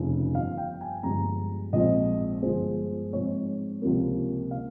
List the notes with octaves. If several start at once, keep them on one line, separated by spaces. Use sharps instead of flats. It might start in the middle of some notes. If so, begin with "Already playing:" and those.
Already playing: F1 F2 C#3 F3
G1 G2 F3 F5
G5
G#5
G1 G2 F3 G#3 A#5
A#1 G#2 F3 C4 D#5
G1 G2 F3 G#3 C5
G#2 F3 C4 D#4 C#5
C#2 C3 F3 A#3
C#3 F5